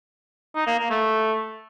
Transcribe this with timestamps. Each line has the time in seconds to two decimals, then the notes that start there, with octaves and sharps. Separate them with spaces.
0.56 D#4
0.67 A#3
0.79 A#3
0.90 A3